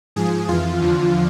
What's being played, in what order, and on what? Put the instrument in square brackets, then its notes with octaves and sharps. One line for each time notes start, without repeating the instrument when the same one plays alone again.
[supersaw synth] G#2 F3 G#4
F2 E3 F4
E2 D3 F3